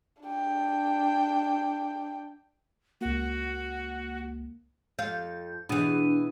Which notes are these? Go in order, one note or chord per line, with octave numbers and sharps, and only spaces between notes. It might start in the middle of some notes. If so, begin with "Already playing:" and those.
D4 G5
C#2 A#3 F#4
F2 F5 G6
B2 E3 D4 D#6 D#7